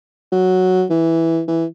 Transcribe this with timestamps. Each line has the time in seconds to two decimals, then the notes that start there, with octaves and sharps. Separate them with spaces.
0.32 F#3
0.90 E3
1.48 E3